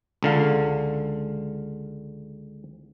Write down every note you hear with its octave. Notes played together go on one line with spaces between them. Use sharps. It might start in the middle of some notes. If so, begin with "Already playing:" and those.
C#2 D3 F5